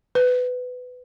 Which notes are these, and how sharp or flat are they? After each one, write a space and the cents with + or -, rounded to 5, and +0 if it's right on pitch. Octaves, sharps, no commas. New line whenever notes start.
B4 +15